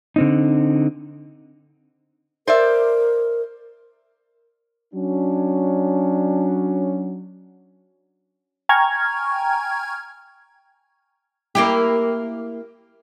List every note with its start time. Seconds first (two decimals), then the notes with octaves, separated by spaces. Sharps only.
0.16 D3 C4 D#4
2.47 A#4 C5 D5 E5
4.94 F#3 C#4 D4
8.69 G5 G#5 A#5 C#6 F6 G#6
11.55 A#3 E4 G4